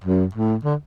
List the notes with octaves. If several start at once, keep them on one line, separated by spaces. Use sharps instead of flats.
F#2
A2
D3